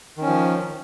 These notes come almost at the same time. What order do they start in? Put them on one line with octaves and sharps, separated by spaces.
D#3 C#4 F3